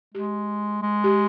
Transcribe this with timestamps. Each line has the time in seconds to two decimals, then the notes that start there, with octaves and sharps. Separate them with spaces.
0.14 G#3 G4
0.82 G#3
1.04 G4